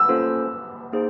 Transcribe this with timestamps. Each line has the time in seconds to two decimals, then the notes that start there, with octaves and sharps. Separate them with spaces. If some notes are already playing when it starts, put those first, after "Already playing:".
Already playing: E6
0.09 A#3 C#4 F4 A4 C5
0.92 A#3 D#4 G#4 C5